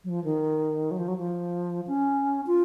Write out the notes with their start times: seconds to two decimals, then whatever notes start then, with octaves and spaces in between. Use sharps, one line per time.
0.04 F#3
0.09 F3
0.24 D#3
0.91 F#3
0.98 F3
1.08 F#3
1.18 F3
1.87 C#4
2.47 F4